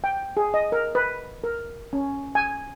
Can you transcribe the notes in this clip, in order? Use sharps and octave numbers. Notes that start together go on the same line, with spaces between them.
G5
G#4
D#5
A#4
B4
A#4
C#4
G#5